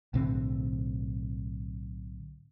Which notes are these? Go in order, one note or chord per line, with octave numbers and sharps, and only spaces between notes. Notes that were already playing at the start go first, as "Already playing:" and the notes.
B1 A2 D3 C4